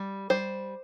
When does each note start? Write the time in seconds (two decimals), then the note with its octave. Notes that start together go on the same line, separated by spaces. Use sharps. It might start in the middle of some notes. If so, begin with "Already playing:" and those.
Already playing: G3
0.30 G3 C5